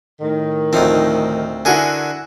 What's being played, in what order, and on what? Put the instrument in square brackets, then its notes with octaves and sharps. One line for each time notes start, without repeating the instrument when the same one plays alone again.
[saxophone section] A2 D#3
[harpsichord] D2 C4 [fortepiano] F3 D#4
[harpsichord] D3 G#4 A#4 [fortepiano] E4 F#4 G#5